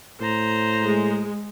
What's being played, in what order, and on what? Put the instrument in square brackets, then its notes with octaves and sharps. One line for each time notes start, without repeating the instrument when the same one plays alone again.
[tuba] A2 [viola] C5 A#5
[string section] G#3